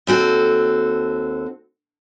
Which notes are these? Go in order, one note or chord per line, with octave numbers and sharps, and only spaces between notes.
D#2 C4 F#4 A4